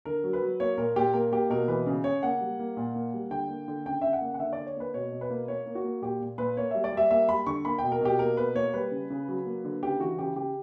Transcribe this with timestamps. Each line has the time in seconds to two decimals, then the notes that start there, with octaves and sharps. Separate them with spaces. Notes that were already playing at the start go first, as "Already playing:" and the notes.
0.05 D3 A#4
0.24 F#3
0.33 B4
0.42 F#3
0.60 A#3 C#5
0.78 A#2 A#4
0.96 A#2 G4
1.14 A#3 A#4
1.32 A#3 G4
1.50 B2 A#4
1.68 E3 B4
1.86 C#3
2.04 C#3 C#5
2.23 A#3 F#5
2.41 G3
2.59 A#3
2.77 A#2
2.95 A#3
3.14 G3
3.31 D3 G5
3.49 A#3
3.68 D3
3.86 C#3 G5
4.02 C#3 E5
4.13 F#5
4.21 A#3
4.34 F#5
4.39 D3 E5
4.53 D5
4.58 D3
4.66 C#5
4.76 A#3 B4
4.94 B2 C#5
5.12 B2
5.21 B4
5.30 A#3
5.48 A#3 C#5
5.66 A#3
5.75 F#4
5.84 A#3
6.02 A#2 G4
6.21 A#2
6.38 A#2 B4
6.57 A#3 C#5
6.71 G3 E5
6.84 D5
6.93 G3 E5
7.11 A#3 E5
7.29 G3 B5
7.47 D3 C#6
7.65 A#3 B5
7.78 B2 G5
7.92 A#4
8.01 B2 G4
8.19 A#3 A#4
8.37 B2 B4
8.55 A#3 C#5
8.74 G3 B4
8.92 C#3
9.10 C#3
9.28 F#3
9.46 A#3
9.65 D3
9.83 C#3 G4
10.00 E3 F#4
10.19 C#3 G4
10.36 C#3 G4